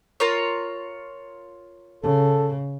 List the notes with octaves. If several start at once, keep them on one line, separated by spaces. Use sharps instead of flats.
F4 A#4 C#5
C#3 A4